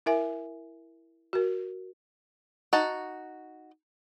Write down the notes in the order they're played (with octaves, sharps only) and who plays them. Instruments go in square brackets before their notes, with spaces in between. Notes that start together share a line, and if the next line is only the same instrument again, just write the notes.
[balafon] E4 A#4 E5 G#5
F#4 A#4
[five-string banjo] D#4 F#4 A5